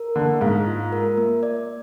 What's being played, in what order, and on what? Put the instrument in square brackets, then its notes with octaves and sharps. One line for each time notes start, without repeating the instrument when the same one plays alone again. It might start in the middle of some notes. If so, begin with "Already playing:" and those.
Already playing: [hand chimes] A#4
[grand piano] D3 [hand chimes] A#3
[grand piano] G#2 [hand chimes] F5
[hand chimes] F4
A#4
A#3
D5